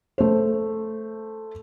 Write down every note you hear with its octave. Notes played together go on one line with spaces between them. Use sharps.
A3 C5